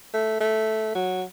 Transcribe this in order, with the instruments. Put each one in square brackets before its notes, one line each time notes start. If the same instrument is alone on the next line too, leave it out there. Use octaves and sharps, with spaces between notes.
[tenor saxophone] A3
A3
F#3